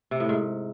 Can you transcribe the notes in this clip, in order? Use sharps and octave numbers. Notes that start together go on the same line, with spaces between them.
C3
A2
G#2